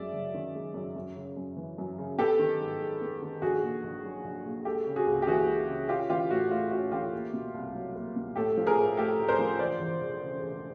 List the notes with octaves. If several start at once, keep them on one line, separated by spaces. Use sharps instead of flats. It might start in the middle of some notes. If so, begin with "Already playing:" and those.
Already playing: F#2 G#3 D5 E5
F#1
D#3
G#3
F#2
F#2
C#3
F#2
E3
F#2
C#3
B3 G4 A4
D#3
G#2
G#3
B3
D#3
A#1 F#4 G#4
A#2
A#1
F#3
A#1
A#2
G#3 G4 A4
C#3
F#4 G#4
C#2
G4
E3 F#4 G#4
G#3
C#3
C#4 F4 G4
E3 F4 G4
A2 F#4
A3 F4
C#4 F#4
E3 F4 G4
A#3
B2
C2
F#3
A#3
B2
A2 G4 A4
F3
G#4 A#4
A2
A3 G4 A4
A2
A#4 C5
F3
E1 C5 D5
E2
E1
C#3
E1